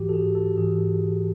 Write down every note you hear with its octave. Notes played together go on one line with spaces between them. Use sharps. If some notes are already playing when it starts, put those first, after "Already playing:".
Already playing: G#2 E3 F#4 G4
A4
G#4
A4
G#2 E3 G#4